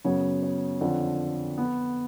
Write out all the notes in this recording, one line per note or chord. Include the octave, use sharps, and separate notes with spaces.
F#2 C#3 F#3 B3 C#5
C#5
F2 D3 F3
B3